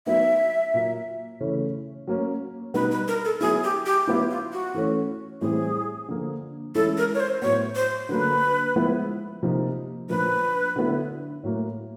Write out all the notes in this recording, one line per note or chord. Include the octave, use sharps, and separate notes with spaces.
F#3 B3 D#4 E5
A#2 F#3 A#3
C#3 E3 A3 C#4
F#3 A#3 C#4
B2 G3 B3 D#4 B4
B4
A#4
A4
F#3 B3 E4 G#4
G4
G4
F#3 B3 E4 F4
F4
F#4
E3 A3 C#4
A2 E3 G3 C4 G#4
D3 F3 A#3
E3 G#3 C#4 E4 A4
A#4
C#5
C5
A2 F#3 B3 C#5
C5
D3 F#3 A#3 B4
F3 G#3 B3 E4
C3 F3 A#3 D#4
A#2 F3 A#3 D4 B4
D3 F#3 B3 E4
A2 F#3 A#3